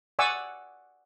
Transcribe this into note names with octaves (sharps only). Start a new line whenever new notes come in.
D5 F#5 G#5 C#6 D6 E6